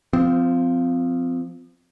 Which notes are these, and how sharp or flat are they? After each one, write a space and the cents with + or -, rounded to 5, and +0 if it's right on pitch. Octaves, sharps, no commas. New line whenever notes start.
F3 +0 C4 -30